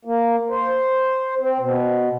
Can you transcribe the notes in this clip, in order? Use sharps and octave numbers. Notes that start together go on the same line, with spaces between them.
A#3
C5
C4
B2